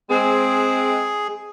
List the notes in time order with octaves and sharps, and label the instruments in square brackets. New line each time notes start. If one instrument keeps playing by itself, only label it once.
[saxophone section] G#3 C4 [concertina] G#4